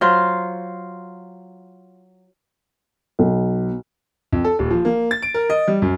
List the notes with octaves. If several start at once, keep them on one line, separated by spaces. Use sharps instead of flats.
F#3 F4 C5
B1
F2
A4
D#1
F3
A#3
A6
D7
A#4
D#5
G3
F#2